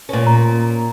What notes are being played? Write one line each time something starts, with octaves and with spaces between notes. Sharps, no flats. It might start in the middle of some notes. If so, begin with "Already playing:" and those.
A#2 C#4
A#5